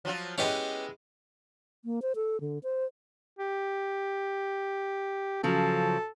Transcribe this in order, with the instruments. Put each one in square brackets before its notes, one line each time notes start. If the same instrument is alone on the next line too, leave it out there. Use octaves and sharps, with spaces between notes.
[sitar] F3 F#3 F4
[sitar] G#3 B3 E4 [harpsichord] C#4 G4 D#5
[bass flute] A#3
C5
A4
D3
C5
[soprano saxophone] G4
[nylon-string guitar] C#3 F3 F#3 [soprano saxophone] A4